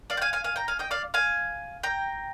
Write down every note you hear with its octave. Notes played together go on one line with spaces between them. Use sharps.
D5 F5
G5
F5 G#5
F5 G#5
F5 G#5
G5 A#5
F5 G#5
D#5 G5
D5 F5
F5 G#5
G5 A#5